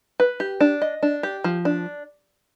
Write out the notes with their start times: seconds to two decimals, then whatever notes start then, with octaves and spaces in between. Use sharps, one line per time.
0.20 B4
0.40 G4
0.60 D4
0.82 D#5
1.03 D4
1.23 G4
1.44 F3
1.65 D4